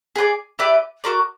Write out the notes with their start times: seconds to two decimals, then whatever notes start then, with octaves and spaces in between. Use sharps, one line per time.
0.16 G#4 B4 D5
0.59 E4 G4 B4 D5
1.04 F#4 A#4 D5